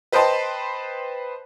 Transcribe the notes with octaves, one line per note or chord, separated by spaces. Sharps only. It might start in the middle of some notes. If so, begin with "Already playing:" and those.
B4 C5 D#5 G5 A5 C6